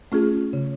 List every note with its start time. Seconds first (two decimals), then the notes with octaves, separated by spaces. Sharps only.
0.12 A3 C#4 F4 G#4
0.53 C#3